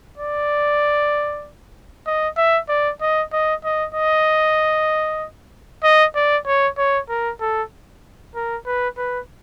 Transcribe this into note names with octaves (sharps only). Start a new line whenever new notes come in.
D5
D#5
E5
D5
D#5
D#5
D#5
D#5
D#5
D5
C#5
C#5
A#4
A4
A#4
B4
B4